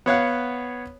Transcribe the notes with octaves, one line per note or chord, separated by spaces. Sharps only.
B3 C#5 F5 F#5